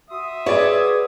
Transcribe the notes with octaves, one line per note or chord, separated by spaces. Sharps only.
F#4 E5 C6 D#6
G#4 B4 C#5 D5